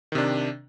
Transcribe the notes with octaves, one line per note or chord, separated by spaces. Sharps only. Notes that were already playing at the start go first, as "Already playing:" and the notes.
C3 D#3 D4